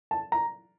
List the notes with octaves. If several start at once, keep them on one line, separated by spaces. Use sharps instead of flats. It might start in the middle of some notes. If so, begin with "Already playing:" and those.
A5
A#5